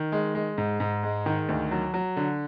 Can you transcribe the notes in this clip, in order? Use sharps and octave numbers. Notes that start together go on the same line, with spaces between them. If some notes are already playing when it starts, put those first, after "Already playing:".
Already playing: D#3
G#3
G#3
G#2
G#2
G#3
D#3
D2
F#3
F#3
D3